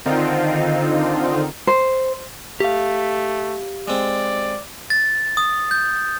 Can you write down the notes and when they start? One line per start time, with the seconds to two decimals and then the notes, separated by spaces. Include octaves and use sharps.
0.06 D3 D#3 C4 D#4 F4
1.67 C5
2.60 A3 G4 F5
3.88 G#3 C4 D5
4.90 A6
5.37 D#6
5.71 G6